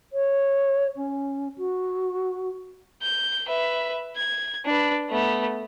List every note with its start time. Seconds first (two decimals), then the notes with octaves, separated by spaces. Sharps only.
0.13 C#5
0.96 C#4
1.58 F#4
3.03 G6
3.49 B4 E5
4.16 G#6
4.65 D4 B4
5.10 A3 B3